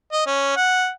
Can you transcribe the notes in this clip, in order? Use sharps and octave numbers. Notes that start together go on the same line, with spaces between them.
D#5
C#4
F#5